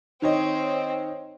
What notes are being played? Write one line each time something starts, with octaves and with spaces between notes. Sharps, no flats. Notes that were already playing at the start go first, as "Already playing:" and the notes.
D#3 C4 C#5 D#5